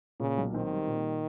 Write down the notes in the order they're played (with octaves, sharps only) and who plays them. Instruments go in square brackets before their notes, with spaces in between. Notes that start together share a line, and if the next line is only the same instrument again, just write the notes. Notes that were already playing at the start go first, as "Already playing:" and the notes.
[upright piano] A#2 [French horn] C#3
[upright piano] B1
[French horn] D#3 [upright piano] C4
[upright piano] G3
A#2